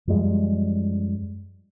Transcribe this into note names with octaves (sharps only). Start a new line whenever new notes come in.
F#2 F3 G3 G#3